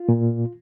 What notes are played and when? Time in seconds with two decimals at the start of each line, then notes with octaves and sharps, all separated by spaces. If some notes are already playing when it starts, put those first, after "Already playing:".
Already playing: F4
0.09 A#2